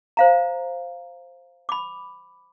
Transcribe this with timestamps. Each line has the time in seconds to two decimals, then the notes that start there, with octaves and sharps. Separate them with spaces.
0.17 C5 F5 A#5
1.69 B5 D6